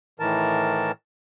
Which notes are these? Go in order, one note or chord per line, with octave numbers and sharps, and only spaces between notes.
A2 D#3 E3 A#4 A5